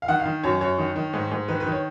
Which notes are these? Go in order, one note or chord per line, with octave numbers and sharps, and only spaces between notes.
F5
D#3 F#5
F5
D#3
F#2 C#5
F#2 C#5
D#3
D#3
G#2
G#2
D#3 B4
B4
D#3
C#5